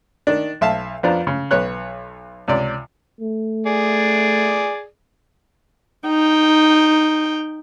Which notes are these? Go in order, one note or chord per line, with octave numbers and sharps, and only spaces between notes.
D#3 D4
B1 E5 F5 A5
F2 B3 D4 F4 C5 A#5
C#3
B1 B3 C#5 F#6
C#2 C3 D5
A3
G#4 D5
D#4 G5